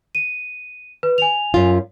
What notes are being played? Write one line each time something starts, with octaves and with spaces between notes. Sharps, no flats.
D#7
B4
G#5 F7
F#2 F4